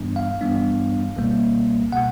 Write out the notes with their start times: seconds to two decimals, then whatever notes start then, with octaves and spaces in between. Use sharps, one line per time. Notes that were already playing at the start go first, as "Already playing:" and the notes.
Already playing: G2 E3 G3 B3 D4
0.16 F5
0.41 G2 E3 G3 B3 D4
1.17 C#2 B2 G3 A#3
1.92 B2 G3 A#3 F#5